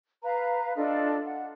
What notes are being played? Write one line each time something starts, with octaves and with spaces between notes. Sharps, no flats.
B4 F5 A#5
D4 F4 A4 D#5
F#5